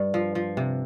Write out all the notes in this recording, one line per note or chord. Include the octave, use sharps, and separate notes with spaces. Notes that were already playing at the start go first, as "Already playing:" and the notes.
Already playing: G2
F3
F3
C3